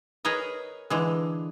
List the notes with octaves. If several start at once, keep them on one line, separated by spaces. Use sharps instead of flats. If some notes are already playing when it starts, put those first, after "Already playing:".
G#4 A#4 B4 C#5 D#5
D3 E3 G#3